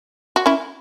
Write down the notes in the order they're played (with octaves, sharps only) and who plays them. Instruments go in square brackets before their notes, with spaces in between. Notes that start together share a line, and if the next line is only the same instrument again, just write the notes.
[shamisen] F#4
C#4 E4